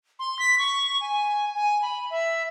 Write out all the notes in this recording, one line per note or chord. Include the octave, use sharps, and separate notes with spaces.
C6
B6
C#6
G#5
G#5
B5
E5